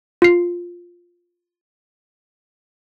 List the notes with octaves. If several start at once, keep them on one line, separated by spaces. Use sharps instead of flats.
F4 C7